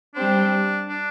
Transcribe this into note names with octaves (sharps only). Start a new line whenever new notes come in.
G3 C4 D4 G4 C5
D4